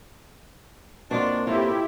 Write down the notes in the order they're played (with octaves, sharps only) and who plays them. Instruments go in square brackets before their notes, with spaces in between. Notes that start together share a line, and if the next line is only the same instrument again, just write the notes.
[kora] B2 F4 [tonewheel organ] A#3 C4 [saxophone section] D4
[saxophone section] A2 [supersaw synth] E4 G4 [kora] F4